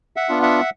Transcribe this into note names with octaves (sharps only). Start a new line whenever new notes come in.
E5 F#5
B3 D4 F4
E5 F#5